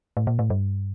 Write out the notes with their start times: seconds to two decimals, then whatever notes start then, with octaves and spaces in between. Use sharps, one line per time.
0.17 A2
0.27 A#2
0.39 A2
0.50 G2